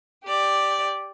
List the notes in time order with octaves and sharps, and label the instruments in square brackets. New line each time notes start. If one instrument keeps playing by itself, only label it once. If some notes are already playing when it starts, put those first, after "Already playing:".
[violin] G4 D5